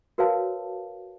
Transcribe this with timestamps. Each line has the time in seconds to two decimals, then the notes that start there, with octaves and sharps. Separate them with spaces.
0.18 F#4 A#4 B4 C#5 F5 A5